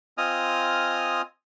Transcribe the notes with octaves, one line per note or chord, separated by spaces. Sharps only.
C4 F4 D#5 G#5 D#6 F6